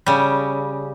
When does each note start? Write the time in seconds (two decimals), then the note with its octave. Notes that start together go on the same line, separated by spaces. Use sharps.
0.06 C#3 G3